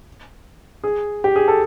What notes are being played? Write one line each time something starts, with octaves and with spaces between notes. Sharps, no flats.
G#4
G4
G#4
A4